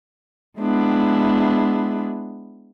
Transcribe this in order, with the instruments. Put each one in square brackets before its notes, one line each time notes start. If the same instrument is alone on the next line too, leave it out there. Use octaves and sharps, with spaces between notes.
[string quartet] G#3 B3 D4 E4